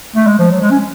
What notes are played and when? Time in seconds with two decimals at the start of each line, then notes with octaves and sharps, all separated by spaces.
0.16 A3
0.27 G#3
0.39 F3
0.51 F#3
0.62 G#3
0.71 C#4